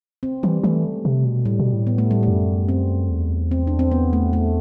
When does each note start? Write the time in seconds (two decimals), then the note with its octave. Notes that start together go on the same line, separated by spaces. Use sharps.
0.23 C4
0.43 E3 G3
0.63 E3 A3
1.05 C3
1.25 B2
1.45 A2 G3
1.59 B2
1.73 A2
1.87 B3
1.98 A3
2.11 G3
2.23 F#2 A3
2.68 C4
3.09 E2
3.51 C4
3.67 D4
3.79 C4
3.92 B3
4.13 A3
4.33 A3